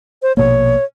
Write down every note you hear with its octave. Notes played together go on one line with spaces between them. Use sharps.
C5
A#1 B2 A#3 C#5